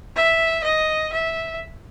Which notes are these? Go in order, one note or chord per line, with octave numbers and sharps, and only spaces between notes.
E5
D#5
E5